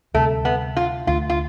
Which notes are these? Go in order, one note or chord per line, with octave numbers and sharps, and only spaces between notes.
D2 C3 G3 A3
B3
F4
D2 D3 A3 F4
F4